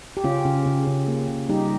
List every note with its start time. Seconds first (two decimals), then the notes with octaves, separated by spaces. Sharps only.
0.17 G4
0.24 C#3 C#4 F4
0.45 C#3
0.66 C#3
0.87 C#3
1.08 A#3
1.29 C#3
1.49 G3 D#4 G4